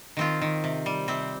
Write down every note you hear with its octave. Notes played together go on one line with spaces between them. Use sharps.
D#3 C4 F4
D#3
C3
G3
C3 C4